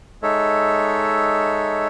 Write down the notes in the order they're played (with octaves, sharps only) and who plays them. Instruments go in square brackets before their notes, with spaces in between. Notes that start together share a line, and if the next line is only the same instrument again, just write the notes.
[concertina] G#3 D#4 A4 C#5 E5